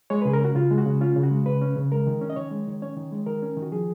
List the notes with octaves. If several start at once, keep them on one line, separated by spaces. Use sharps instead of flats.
G#3 C#5
B4
C#3 G#4
A#4
C#4 F#4
C#3 F4
G#3
F#4
C#3
C#4 F4
C#3
F#4
G#3
C#3 B4
C#4
C#3
G#3 A#4
D#3
C#4
D#5
D#3 C#5
G#3
D#3
C#4 C#5
D#3
G#3
D#3 A#4
C#4
D#3
F#4
F3 G#4